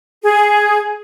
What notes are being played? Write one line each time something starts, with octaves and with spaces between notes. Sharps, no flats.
G#4